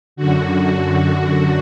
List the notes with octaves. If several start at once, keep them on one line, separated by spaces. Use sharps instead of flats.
F#2 D3 F#4